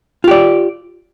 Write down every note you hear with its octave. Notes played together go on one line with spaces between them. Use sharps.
F4 G4 D5